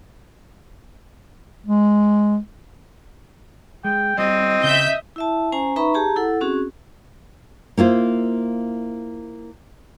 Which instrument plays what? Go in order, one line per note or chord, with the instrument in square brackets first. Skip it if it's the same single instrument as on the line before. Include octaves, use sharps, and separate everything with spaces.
[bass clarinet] G#3
[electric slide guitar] G#3 [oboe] G5
[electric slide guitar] G3 [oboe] C4 [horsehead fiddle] D#5
[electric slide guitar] C#3 [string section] E5 G6
[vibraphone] E4 E5 A5
C#4 C5 G#5 A#5
D#4 B4 E5 A#5 B5 C#6
G4 G#4 A5 A#5
E4 A4 F#5
C4 C#4 F#4 G#4
[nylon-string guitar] A#3 E4 F4 C5